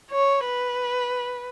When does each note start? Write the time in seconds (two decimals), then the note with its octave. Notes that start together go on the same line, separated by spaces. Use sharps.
0.11 C#5
0.46 B4